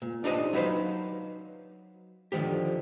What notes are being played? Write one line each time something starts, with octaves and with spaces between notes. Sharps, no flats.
A#2
D4 D#4 G4 C5 D#5
F#3 D#4 B4 C5 F5
D3 D#3 F3 G4